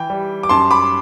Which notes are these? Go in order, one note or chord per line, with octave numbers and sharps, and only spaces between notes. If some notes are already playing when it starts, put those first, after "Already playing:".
Already playing: E3 G5
G3
D6
F#2 A5 C6
B5 D6